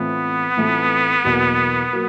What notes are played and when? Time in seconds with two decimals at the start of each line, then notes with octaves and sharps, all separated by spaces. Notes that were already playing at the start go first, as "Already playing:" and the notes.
Already playing: A2 E3 A3 B3 C4 F4
0.57 A2 E3 A3 C4 F4
1.25 E2 B2 F#3 A#3
1.93 F#3 A#3